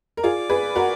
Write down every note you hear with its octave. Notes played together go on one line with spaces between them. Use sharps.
A#4
F4 G#4 D5
G#4 B4
F#4 A#4